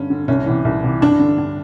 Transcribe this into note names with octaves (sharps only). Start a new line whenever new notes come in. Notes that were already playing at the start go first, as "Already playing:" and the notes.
Already playing: G2 D3 C#4
D3
C2 C#4
C3 E3
C2
C3 E3
G2 D4
D3
G2